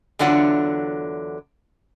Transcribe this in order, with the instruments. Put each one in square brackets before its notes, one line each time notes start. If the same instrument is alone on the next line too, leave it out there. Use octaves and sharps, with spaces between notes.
[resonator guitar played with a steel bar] E2 D3 F#3 D4 F4 F#5